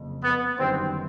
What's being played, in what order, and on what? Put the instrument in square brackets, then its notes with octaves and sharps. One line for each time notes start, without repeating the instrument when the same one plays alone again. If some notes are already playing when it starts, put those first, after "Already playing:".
Already playing: [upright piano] F#1 F2 C#3
[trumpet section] B3
[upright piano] G1 F#2 D#3 G3 B3 [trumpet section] C4